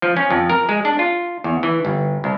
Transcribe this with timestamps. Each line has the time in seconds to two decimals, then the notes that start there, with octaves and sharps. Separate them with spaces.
0.02 F3
0.17 C#4
0.31 F2
0.50 A#4
0.69 G#3
0.85 D4
0.99 F4
1.44 E2
1.63 E3
1.85 G1
2.24 C2